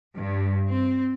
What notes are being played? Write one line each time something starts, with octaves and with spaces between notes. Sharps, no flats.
G2
C4